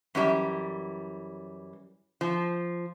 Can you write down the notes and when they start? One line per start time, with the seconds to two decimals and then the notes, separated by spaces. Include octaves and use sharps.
0.15 F#2 E3 G3
2.21 F3